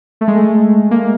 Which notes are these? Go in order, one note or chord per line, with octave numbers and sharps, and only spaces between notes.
A3
G#3
A3
A#3